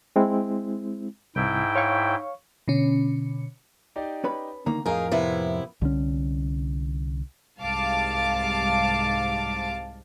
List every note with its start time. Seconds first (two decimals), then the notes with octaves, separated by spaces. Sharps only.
0.16 G#3 C4 E4
1.36 C2 G#2 E4 G5
1.76 C#5 F5 C#6
2.68 B2 D3 C#4
3.96 D#4 G4 D5
4.24 C#4 B4 B5
4.66 D3 D#3 A#3 A#5
4.86 F2 A2 D#4 G#4 A#4 F5
5.11 C3 B3 E4
5.81 C2 D3 D#3 C#4
7.60 C2 G#2 F5 A5 D6